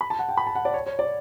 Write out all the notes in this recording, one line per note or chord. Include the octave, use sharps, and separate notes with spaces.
B5
A5
F#5
G5
B5
A5
F#5
D5
C#5
C#5
D5